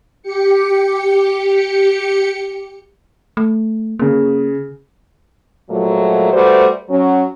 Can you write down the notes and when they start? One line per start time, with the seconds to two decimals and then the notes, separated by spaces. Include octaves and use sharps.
0.23 G4 C#7
3.37 A3
3.99 C#3 A#3 G#4
5.69 A#2 F3 F#3 G#3 A3
6.32 G3 A3 F#4 B4 C5
6.89 F#3 C#4